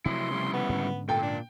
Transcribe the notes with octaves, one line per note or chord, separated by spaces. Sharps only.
C3 F3 F#3 A3 E4 C6
C#3 G3 E4
B3
G#2 D3 C#4
A#2 A4 G5
D4